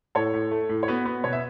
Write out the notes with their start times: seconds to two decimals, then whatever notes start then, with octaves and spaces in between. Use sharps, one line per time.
0.15 A2 A4 C#5
0.34 A2
0.51 A3
0.69 A2
0.83 C#5
0.88 B3 F#4 B4
1.06 B3
1.24 B2 C#5
1.33 E5